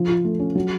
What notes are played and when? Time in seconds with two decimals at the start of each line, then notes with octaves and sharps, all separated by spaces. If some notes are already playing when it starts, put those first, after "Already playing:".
Already playing: F3
0.09 F4
0.25 A3
0.39 C#4
0.55 F#3